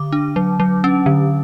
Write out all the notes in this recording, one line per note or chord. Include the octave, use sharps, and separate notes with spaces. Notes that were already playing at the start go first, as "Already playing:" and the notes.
Already playing: D3 D6
D4
F#3
F#3
C#4
D3